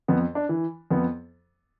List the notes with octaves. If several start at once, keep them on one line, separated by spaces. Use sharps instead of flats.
F2 B3
D4
E3
F2 B3